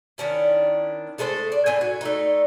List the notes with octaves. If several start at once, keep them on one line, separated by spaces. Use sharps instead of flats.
D#3 C#4 D4 E4
G#3 A3 A4 C5
D5
A2 C4 G#5
F#4
A3 D4 D#4